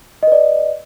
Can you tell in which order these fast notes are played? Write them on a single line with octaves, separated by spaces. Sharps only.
D#5 B4 D5